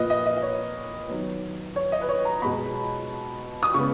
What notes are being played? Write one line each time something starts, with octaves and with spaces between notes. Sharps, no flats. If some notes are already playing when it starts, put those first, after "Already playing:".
Already playing: A#2 F3 A#3 B4 D#5
D#5
D#5
D#5
C#5
D#3 F#3 B3
C#5
D#5
B4
C#5
A#5
B2 G#3 B3 B5
D#6
C#3 G#3 B3 C#6